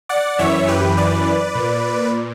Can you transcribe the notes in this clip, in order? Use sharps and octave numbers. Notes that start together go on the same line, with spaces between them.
D5 F#5
F#2 E3 C#5 E5
G4 B4
B4 D5
A#2